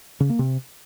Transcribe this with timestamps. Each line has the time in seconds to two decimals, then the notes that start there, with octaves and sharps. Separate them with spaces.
0.20 C#3
0.30 A#3
0.39 C3